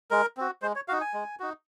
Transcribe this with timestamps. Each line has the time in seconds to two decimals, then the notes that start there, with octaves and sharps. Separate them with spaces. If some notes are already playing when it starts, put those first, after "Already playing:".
0.11 G#3 A#4
0.37 C4 F#4
0.62 G#3 C5
0.76 C#5
0.88 D#4 F#4 F5
1.01 G#5
1.14 G#3
1.40 D#4 F#4